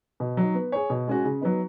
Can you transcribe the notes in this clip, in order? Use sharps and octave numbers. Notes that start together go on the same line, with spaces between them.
B2
F#3 D#4
B3
G#4 C#5
B2
G#3 C#4 F#4
C#3
F#3 B3 D#4